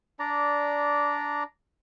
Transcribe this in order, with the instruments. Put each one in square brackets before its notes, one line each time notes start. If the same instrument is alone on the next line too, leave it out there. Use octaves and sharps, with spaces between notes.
[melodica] D4 D5 A#5